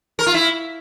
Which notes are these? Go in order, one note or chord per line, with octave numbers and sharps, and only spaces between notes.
A#4
F4
E4